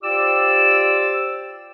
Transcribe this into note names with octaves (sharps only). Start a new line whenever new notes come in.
F4 G4 C5 D5 D6 E6